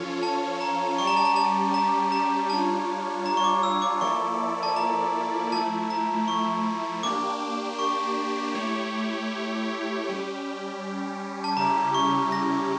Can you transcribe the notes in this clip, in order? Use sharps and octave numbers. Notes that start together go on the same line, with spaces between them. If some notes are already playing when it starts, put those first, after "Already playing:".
Already playing: F3 C#4 F4 A4 C#5
A5
A#5
G3 C#4 G4 D5 C#6
A#5
A5
A#5
A5
A#5
A#5
G3 D4 F4 C#5 A5
A#5
C#6
D6
E6
D6
F3 A#3 E4 A4 D5 C#6
A5
A#5
F3 A3 E4 A5
A#5
C#6
A#3 D4 G4 D6
C#6
A3 E4 G4 C#5
G3 C#4 G4
A5
C#3 G3 C#4 E4 G4 A#5
C#6
A#6